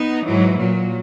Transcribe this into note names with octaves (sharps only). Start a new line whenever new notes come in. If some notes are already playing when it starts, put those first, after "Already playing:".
Already playing: B3 D#4
G#2 E3 F#3
A#2 F#3